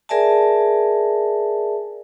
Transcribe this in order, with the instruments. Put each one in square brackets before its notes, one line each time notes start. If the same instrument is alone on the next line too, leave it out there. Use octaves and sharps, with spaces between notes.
[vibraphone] G#4 A#4 D5 E5 G#5 A5